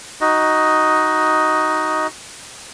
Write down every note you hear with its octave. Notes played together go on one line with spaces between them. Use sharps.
D#4 F#4 D#5